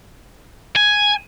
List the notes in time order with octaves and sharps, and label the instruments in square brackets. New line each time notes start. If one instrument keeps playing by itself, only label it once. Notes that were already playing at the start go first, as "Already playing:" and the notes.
[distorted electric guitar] G#5